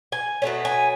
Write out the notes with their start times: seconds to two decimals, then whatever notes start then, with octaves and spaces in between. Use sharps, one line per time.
0.12 G#5
0.42 B2 F#3 A3 C#4
0.65 G#5